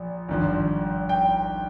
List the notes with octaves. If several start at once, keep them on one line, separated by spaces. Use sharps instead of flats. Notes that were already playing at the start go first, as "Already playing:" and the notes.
Already playing: A#1
G#1 G2 F3
G5